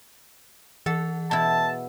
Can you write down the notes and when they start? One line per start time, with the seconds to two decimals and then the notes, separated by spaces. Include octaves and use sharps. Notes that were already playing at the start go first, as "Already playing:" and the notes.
0.86 E3 G#4 A4 F#5
1.31 B2 E4 A5